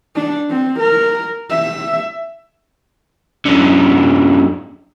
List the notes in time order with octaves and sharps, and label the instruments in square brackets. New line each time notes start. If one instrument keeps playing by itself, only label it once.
[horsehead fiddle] D4
C4
A#4
E5
[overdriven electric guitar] F#2 D3